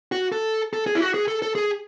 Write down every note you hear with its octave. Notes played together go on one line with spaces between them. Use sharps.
F#4
A4
A4
G#4
E4
F#4
G#4
A4
A4
G#4